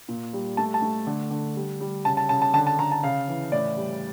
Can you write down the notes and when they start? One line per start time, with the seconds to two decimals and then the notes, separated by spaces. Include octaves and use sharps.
0.08 A#2
0.33 G3
0.57 A3 A5
0.74 A5
0.82 A3
1.07 D3
1.31 D3
1.56 G3
1.80 G3
2.05 C#3 A5
2.17 A5
2.29 C#3 A5
2.42 A5
2.54 D3 A5
2.67 A5
2.79 D3 A#5
2.92 A5
3.04 C#3 F5
3.28 E3
3.52 A2 D5
3.77 G3